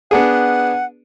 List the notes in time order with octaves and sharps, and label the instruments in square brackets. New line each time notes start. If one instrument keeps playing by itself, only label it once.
[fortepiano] B3 D4 G#4 [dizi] F#5